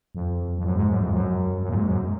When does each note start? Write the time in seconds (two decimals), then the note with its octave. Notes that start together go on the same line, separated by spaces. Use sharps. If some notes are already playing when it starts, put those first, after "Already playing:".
0.15 F2
0.58 F2
0.64 F#2
0.76 G#2
0.89 F#2
1.01 F2
1.13 F#2
1.62 F#2
1.69 A#2
1.75 G#2
1.87 F#2